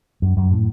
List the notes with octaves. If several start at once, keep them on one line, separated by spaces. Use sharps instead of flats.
F#2
F#2
A2